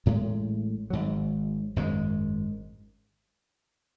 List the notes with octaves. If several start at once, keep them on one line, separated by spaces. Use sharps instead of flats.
A1 A2 G#3
G#1 G#2 F#3
G#1 F#2 D#3 G#3